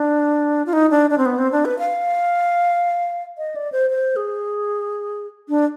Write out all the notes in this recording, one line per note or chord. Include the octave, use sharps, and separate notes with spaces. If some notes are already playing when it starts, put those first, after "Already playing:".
Already playing: D4
F4
D#4
D4
D4
C4
B3
C4
D4
B4
F5
D#5
D5
C5
C5
G#4
D4